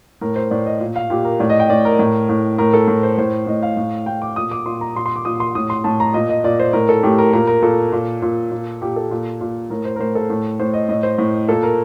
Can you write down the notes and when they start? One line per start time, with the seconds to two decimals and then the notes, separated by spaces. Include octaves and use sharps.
0.21 A2 A#4
0.36 C5
0.51 A2 D5
0.66 D#5
0.80 A#2
0.96 F5
1.10 A#2 G4
1.25 A#4
1.40 A2 D5
1.50 D#5
1.60 G5
1.70 A2 D5
1.85 A#4
1.99 A2
2.29 A2
2.58 A2 A#4
2.73 A4
2.88 A2 A#4
3.03 C5
3.18 A2 C5
3.47 A2 D#5
3.63 F5
3.77 A2
4.06 A2 G5
4.22 D6
4.36 A#2 D#6
4.51 D6
4.66 A#2 C6
4.81 A#5
4.96 A#2 C6
5.06 C6
5.16 D6
5.25 A#2 D#6
5.40 C6
5.55 A2 D#6
5.70 C6
5.84 A2 A5
6.00 A#5
6.14 A#2 D#5
6.29 D#5
6.44 A#2 D5
6.60 C5
6.73 A2 A#4
6.89 A4
7.03 A2 G4
7.18 A#4
7.33 A#2 A#4
7.47 A#4
7.62 A#2 A4
7.92 A#2
8.22 A#2
8.52 A#2
8.82 A#2 G4
8.96 A4
9.11 A#2
9.41 A#2
9.70 A2 A#4
9.85 C5
9.96 A#4
10.00 A2 C5
10.15 A4
10.30 A2
10.60 A2 C5
10.74 D#5
10.89 A2 D#5
11.03 C5
11.18 A2
11.49 A#2 A4
11.63 A#4